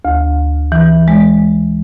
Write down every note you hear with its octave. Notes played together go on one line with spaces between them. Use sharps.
D2
E3
G#3